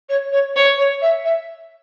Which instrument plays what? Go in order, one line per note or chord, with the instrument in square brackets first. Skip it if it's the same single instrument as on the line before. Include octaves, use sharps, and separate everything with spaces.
[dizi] C#5
C#5
[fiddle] C#5
[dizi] C#5
E5
E5